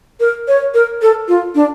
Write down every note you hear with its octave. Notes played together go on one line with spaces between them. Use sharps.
A#4
C#5
A#4
A4
F4
D4